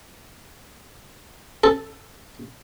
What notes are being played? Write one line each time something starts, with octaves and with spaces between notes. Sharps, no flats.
A4